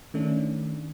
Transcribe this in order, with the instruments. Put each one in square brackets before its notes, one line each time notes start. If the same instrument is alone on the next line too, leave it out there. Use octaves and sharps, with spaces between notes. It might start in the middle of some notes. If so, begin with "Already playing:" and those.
[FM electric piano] D#3 A3 C#4 D4